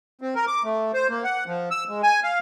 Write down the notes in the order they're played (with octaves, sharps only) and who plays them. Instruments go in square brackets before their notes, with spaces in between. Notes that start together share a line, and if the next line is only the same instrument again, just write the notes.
[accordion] C4
A#4
D6
A3
C5
A#3
F#5
F3
E6
G#3
G#5
F5